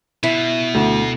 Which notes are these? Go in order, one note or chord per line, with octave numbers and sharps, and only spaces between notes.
B2 E4
D2